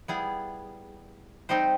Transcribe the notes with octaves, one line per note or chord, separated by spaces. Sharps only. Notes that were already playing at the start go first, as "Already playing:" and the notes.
G3 B3 E4 G#4
G3 C4 D#4 G4 C5